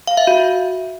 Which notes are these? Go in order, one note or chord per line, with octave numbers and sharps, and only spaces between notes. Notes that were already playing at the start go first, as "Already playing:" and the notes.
F5
E5
F#4